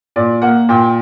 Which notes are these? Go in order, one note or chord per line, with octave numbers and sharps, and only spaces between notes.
A#2 D5
A#3 F#5
A#2 G5